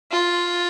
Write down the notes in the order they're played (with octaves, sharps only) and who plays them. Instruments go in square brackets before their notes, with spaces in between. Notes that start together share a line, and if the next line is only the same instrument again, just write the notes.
[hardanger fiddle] F4